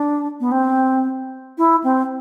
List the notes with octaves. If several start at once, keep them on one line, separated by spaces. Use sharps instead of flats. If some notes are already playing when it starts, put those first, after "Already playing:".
Already playing: D4
B3
C4
E4
C4